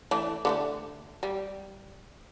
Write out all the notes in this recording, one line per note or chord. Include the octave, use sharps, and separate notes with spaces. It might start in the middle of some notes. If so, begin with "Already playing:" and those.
E3 A3 D4
D3 F3 A3
G3